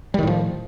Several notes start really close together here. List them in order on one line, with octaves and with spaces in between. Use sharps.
G3 D#3 A2 F3